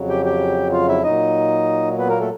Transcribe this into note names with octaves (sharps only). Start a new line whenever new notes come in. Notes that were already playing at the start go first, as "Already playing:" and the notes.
Already playing: F2 C#3 F#3
G4 G5
G4 G5
F4 F5
E4 E5
A#2 F#3 D#4 D#5
B3 B4
A#3 A#4
A3 A4